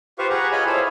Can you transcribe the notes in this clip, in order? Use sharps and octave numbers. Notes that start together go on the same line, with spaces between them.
F4 G4 B4 C5 F5 C#6
G4 G#4 B4 F#5 A#5 C#6
F4 C#5 D#5 G#5 B5
E4 A4 C5 C#5 F5